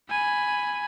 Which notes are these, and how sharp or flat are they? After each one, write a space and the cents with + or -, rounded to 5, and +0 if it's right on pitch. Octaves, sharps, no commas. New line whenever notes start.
G#5 +0 B5 +0